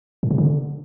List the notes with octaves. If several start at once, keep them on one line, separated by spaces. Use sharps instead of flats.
A2
C3
D3